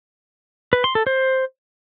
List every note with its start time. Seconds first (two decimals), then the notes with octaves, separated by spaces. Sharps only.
0.73 B4
0.84 C6
0.95 A4
1.07 C5